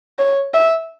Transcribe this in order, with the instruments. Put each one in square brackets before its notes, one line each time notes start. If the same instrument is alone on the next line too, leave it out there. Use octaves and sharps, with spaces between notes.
[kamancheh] C#5
E5